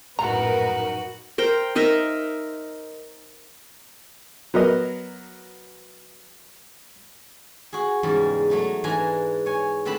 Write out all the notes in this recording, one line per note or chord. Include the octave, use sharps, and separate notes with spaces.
A#1 F#2 A2 D#4 F#4 A#4 B4 A#5
A#4 C5 G5
D#4 A#4 D#5 E5
F#3 B3 A#4 D#5
F#4 G#4
E2 G#2 C#3 G3
F#3 A3 D#4
G#2 E3 D4 G#5 A#5
C#5 G#5
D3 C4 G4 B4 A5 B5